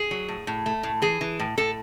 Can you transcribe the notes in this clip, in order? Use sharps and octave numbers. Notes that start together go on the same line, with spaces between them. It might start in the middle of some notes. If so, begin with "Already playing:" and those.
Already playing: G#4
F#3
A2
A2
A3
A2
E3 G#4
E3
A2
A2 A4